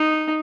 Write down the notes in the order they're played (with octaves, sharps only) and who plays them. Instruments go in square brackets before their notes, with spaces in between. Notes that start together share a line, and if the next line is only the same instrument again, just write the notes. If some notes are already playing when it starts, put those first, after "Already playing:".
Already playing: [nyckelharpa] D#4